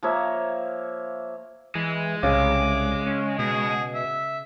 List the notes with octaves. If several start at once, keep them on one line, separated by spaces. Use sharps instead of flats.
F3 A#3 C#5 E5
E3 G#3
C2 C#3 D6
C#4
B2 G#4
E5